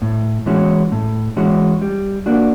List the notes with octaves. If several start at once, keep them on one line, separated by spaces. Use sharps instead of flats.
A2
E3 G#3 C#4 F#4
A2
E3 G#3 C#4 F#4
G3
A#3 D4 F#4